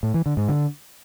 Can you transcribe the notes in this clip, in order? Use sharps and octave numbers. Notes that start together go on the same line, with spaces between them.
A2
E3
D3
G#2
D3